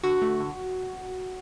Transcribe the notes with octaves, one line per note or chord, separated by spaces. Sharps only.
D3 F#4
A3
D3